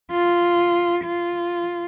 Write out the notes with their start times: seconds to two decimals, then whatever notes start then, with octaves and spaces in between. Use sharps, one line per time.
0.11 F4
1.05 F4